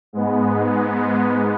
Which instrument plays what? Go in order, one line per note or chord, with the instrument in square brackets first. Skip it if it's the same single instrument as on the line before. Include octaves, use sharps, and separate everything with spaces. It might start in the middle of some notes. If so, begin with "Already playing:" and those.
[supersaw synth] G#2 G#3 B3